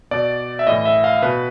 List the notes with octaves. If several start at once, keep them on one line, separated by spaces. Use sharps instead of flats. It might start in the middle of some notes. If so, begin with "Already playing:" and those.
B2 D5
E5
A2 E3 D#5
E5
F5
B2 B4